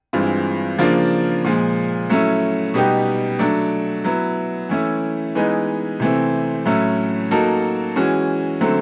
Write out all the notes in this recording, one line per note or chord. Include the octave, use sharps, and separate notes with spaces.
G2 E3 G#3 C4 F4
C#3 F3 A#3 D4 F4
A#2 F3 G#3
F#3 A3 C#4 E4
B2 G3 B3 D#4 G4
F#3 A3 D4
F#3 B3 E4
E3 A3 C#4 E4
E3 G#3 B3 D#4
C3 E3 A3 C4
A2 F#3 A3 C#4 E4
F#3 A#3 D#4 F#4 A4
E3 G#3 C#4 F#4
D3 F#3 A3 C4